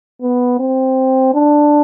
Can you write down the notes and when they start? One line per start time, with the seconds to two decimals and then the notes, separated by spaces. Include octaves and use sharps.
0.22 B3
0.60 C4
1.34 D4